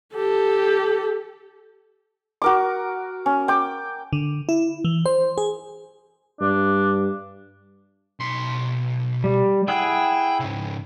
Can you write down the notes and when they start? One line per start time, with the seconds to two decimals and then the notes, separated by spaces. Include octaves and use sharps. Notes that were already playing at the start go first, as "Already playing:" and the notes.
0.15 G4 A4
2.42 F#4 A#4 D6
3.26 C#4
3.48 G5 D6
4.13 D3
4.49 E4
4.85 E3
5.06 C5
5.38 G#4
6.41 G2 D4
8.20 B1 C6
9.24 G3
9.68 E4 G#4 F#5 G5
10.40 G#2 C#3